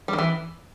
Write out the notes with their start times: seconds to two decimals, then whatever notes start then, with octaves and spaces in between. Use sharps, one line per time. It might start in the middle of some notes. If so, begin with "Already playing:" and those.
0.08 G3
0.13 D#3
0.18 E3